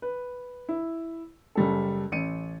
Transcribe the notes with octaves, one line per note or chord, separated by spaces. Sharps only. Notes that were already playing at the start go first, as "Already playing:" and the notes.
B4
E4
F#1 G3 A4
A1 C#7 D#7